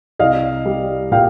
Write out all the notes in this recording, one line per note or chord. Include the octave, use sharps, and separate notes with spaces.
C2 D#5 F5
G3
A#2 F5 G5